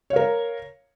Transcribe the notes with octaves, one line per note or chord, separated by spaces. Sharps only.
A#4 C#5 F5